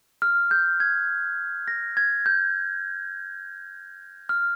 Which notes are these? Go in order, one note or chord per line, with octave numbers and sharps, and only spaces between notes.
F6
G6
G#6
A#6
G#6
G6
F6